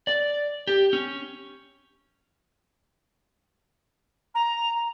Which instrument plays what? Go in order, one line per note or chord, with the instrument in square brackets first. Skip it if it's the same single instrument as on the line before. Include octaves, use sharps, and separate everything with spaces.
[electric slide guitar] D5
G4
C#4
[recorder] A#5